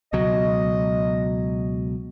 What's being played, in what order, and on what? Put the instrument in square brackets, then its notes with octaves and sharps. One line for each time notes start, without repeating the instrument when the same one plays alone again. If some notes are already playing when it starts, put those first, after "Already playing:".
[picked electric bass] C#2 B2 F#3 [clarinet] D#5